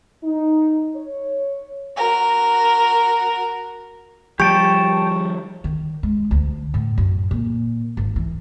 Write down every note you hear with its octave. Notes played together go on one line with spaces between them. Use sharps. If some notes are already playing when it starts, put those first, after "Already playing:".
D#4
C#5
F#4 A#4
F3 G3 G4 G5 A5 C#6
D#3
G#3
D2
A2
F#2
A#2
G#1
E3